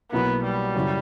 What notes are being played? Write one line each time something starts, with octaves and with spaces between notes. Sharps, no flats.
B1 B2 A#3 B3 E4
G3
F#2 C#3 F#3 C#4 E4